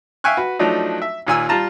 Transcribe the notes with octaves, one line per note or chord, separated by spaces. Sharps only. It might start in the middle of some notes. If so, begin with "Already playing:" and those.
E5 F5 G5 G#5 C#6 F#6
F#4 B4
F3 F#3 A3 D4 D#4
E5
D#2 A#2 G#5 E6
G3 F4 A5 A#5